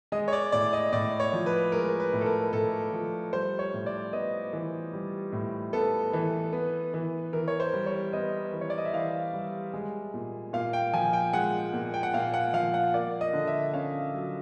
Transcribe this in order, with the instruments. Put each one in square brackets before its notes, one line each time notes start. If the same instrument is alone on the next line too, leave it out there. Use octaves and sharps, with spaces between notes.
[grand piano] G#3 D#5
C#5
D5
A2 D5
D#5
A2 D5
C#5
F3
B4
G#3 A#4
B4
A2
A4
A#4
A2 A4
F3
G3 C5
C#5
A2
D5
B3 D#5
E3
G3
A2
B3 A4
E3
B3
E3
E3 A#4
C#5
C5
G3
C#5
B3 D#5
E3
C#5
D5
D#5
E5
E3 F5
G3
G#3
A#2
A#2 F5
G5
F3 G#5
G5
G#3 F#5
A#2
G5
F#5
A#2 F5
F#5
F3 F5
F#5
A#3 D5
D#5
D3
E5
C#4 F5
F#3